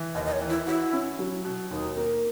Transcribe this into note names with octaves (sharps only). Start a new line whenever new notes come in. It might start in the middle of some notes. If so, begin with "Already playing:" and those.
Already playing: E3
D#2 D#5
D#5
C#5
E3
E4
E4 F#4
C#4
F#3
B2
D#2 D#4
A#3